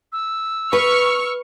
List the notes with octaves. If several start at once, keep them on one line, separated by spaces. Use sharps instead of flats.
E6
B4 C#6 F6